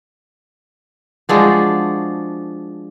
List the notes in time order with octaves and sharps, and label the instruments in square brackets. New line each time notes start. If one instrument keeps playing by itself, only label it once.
[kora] F3 G#3 D4 F#4